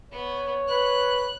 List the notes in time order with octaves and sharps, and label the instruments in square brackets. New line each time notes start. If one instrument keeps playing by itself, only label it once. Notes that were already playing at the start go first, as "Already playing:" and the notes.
[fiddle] B3 [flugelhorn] C#5
[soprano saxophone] B4 [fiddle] F#6